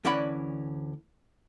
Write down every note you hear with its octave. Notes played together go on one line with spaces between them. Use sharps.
D2 E3 C#4 D5 F#5 B5